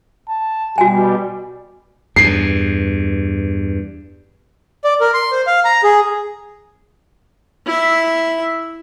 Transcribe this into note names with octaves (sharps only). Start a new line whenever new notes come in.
A5
B2 G3 F#4 G4 G#5
E2 G2 C7
D5
A#4
C6
C5
F5
A#5
G#4
E4 E5